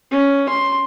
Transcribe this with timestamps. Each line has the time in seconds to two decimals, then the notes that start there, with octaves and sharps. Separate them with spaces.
0.12 C#4
0.49 C6